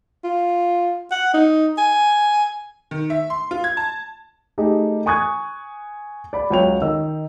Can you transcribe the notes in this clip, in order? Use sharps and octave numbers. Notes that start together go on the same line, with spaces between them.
F4
F#5
D#4
G#5
D#3
E5
C6
F4
G#6
A5
A3 D#4 G4 G#4
G#5 C#6 D#6 F#6 G#6
D5 B5
C#2 F#3 C#5 G5 F7
D#3 D#4 E6